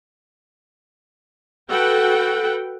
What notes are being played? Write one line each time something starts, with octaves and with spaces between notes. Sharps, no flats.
F#4 A4 B4 F#5 G5